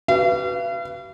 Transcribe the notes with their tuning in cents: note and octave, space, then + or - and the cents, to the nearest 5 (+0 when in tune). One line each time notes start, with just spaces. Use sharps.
F#4 +45 B4 +0 F5 -40